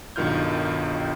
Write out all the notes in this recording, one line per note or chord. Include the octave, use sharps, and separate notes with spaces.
B1 G2 D#3 F4 F6 G6